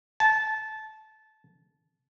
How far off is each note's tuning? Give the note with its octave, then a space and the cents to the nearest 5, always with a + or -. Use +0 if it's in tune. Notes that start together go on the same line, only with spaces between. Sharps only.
A5 -20